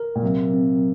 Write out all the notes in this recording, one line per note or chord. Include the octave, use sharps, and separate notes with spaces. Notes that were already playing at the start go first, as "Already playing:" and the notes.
Already playing: A#4
A#2
C3 F#3
C4